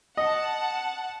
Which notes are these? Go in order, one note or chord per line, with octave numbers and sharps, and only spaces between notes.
D#5 F#5 A5